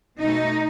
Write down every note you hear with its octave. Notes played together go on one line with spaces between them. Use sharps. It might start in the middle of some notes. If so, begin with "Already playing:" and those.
B2 A3 D#4